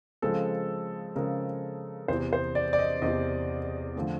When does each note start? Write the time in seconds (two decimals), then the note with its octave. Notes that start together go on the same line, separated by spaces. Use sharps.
0.22 C#3 F3 G#3 C4 A4
1.15 C#3 F3 G#3 C4 A#4
2.08 E2 C3 E3 C5
2.33 C5
2.55 D5
2.73 D5
2.79 D#5
3.02 E2 C3 E3 D#5
3.96 D3 F3 A3 C4